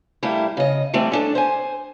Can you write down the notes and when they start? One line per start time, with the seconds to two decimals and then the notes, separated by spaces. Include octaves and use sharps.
0.23 G3 A3 A#3 E4
0.57 C#3 D#5
0.94 E3 G3 A3 C4
1.12 C#4 D4 A4
1.35 C5 G#5